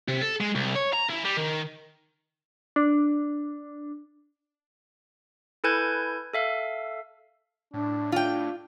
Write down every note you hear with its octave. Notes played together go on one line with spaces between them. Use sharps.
C3
A4
G#3
C2
C#5
A#5
E3
G3
D#3
D4
E4 A4 B4 G#5 G6 G#6
A4 E5 F5
A2 D4
D4 F4 G5